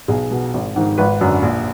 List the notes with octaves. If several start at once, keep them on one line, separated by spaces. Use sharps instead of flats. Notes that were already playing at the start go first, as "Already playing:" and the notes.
B1 G#4
B2
G#1
G#2 D#3
G#1 B4
F#2 D3
A#1